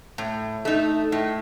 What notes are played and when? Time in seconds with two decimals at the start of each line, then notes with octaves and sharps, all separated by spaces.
0.18 A2
0.65 A3 D#4
1.12 A2